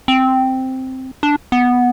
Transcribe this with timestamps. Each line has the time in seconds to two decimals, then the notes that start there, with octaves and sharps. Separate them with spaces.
0.08 C4
1.23 D4
1.52 B3